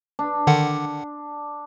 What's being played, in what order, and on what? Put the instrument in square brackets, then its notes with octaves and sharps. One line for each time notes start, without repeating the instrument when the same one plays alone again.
[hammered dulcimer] D4
[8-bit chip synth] D3 D#3 F#5